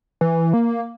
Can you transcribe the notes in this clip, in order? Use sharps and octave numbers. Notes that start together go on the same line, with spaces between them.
E3
A#3